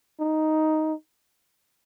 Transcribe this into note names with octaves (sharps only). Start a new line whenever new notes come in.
D#4